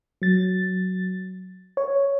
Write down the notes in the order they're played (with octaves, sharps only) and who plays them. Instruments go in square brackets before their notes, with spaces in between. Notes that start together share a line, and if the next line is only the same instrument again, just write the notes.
[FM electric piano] F#3 A6
C#5